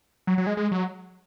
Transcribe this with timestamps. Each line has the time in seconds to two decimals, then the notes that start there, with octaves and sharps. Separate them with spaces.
0.27 F#3
0.38 F#3
0.47 G#3
0.57 G#3
0.72 F#3